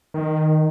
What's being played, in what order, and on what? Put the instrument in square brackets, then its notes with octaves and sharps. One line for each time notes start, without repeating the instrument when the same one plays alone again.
[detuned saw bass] D#3